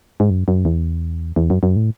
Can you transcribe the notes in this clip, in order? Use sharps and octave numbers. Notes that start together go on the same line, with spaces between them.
G#2
F#2
F#2
E2
E2
F#2
F#2
A2